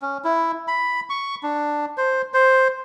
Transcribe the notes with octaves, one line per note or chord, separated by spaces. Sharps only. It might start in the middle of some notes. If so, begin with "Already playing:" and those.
C#4
E4
B5
C#6
D4
C5
C5